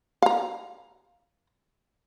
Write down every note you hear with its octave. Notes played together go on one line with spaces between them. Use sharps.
F5 A#5